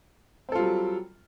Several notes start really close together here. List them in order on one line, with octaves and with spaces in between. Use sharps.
C4 A4 F4 G3 F#3